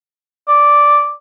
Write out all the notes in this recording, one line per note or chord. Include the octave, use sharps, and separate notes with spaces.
D5